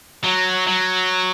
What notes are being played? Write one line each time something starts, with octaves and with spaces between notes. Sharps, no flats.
F#3
F#3